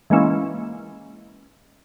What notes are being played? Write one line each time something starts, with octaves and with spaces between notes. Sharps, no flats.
E3 G#3 A#3 C#4 E4